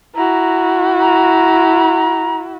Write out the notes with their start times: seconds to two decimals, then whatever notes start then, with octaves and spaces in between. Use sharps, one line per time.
0.15 E4 F#4 A#5
1.00 A#5